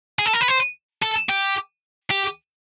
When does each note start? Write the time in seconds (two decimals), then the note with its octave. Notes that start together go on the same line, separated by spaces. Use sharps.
0.19 G#4
0.26 A4
0.33 A#4
0.41 B4
0.48 C5
1.02 A4
1.29 G4
2.11 G4